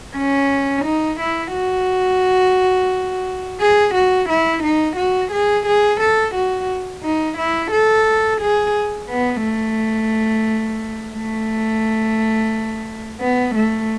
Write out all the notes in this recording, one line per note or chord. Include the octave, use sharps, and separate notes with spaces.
C#4
D#4
E4
F#4
G#4
F#4
E4
D#4
F#4
G#4
G#4
A4
F#4
D#4
E4
A4
G#4
B3
A3
A3
B3
A3